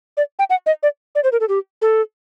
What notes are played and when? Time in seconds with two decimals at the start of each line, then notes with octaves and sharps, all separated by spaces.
0.17 D5
0.39 G5
0.50 F#5
0.66 D#5
0.83 D5
1.15 D5
1.24 C5
1.32 A#4
1.40 A4
1.49 G4
1.82 A4